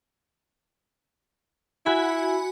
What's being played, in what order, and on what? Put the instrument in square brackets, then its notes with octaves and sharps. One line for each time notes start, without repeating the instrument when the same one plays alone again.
[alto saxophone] E4 [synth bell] F#4 G#5 B5